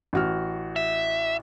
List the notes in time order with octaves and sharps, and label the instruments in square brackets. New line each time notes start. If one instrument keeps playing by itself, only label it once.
[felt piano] A1 F#4 F6
[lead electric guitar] E5